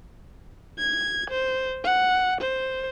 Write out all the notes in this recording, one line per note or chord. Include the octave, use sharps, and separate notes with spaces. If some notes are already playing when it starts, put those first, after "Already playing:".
G#6
C5
F#5
C5